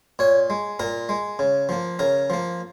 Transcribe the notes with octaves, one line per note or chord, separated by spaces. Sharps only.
A#2 C#5
G#3
A#2 A#4
G#3
C#3
F3 A#3
C#3 A#4
F3 A#3